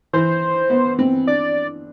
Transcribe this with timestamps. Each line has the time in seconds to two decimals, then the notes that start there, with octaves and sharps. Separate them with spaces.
0.13 E3 C5
0.70 B3
0.99 C4
1.27 D4 D5